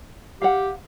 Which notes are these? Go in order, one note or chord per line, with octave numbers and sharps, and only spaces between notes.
G4 F5 F#5